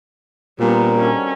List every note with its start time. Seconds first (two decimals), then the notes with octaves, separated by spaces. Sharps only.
0.59 A#2 G3 B3 C4 D4 A#4
1.01 D#3 C#4 F#4 A4